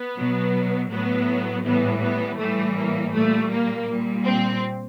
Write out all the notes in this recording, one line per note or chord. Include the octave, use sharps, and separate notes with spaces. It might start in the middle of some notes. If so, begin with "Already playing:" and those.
Already playing: B3
B2 F#3
A2 F#3 B3
A2 E3 G3 B3
B3
A2 E3 G3 A3
A#3
A#2 G3 A3
A#3
A#2 G3
C4